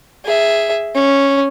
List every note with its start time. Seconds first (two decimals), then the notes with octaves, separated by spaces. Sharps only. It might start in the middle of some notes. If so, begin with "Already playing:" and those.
0.25 G#4 E5
0.95 C#4